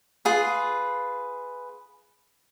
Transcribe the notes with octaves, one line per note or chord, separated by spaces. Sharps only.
F4 G#4 B4